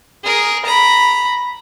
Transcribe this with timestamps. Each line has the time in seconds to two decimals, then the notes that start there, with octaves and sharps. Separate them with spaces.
0.24 G#4 A#4
0.66 A#5 B5